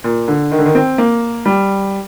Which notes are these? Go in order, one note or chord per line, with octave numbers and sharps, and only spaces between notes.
A#2
D3
D#3
D3
D#3
C4
A#3
G3